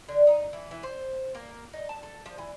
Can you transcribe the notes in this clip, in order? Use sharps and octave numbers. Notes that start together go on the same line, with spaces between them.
D3
D#4
E3
E3
C5
A#3
D#4
A5
A4
F3
E3